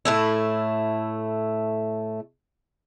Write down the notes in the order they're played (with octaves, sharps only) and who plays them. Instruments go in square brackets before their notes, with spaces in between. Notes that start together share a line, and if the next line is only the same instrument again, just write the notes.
[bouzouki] A2 A3 E4